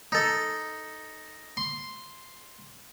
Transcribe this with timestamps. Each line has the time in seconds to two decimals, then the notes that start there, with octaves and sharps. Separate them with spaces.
0.12 D#4 A4
1.57 C6